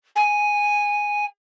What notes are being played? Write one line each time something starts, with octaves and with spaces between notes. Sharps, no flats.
G#5